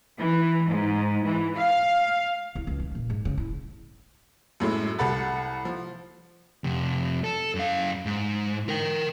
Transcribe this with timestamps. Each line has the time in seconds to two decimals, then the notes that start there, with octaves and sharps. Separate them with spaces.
0.18 E3
0.67 G#2
1.25 E3
1.58 F5
2.55 C2
2.67 C#2
2.80 D#3
2.95 A#2
3.10 G#2
3.25 C#3
3.38 E4
4.60 F#2 A2 G#3 A3
4.99 C2 A4 F#5 B5 A6
5.65 F3
6.64 F2 C3
7.24 A4
7.55 F#2 F5
8.06 G#2
8.69 A#4 G5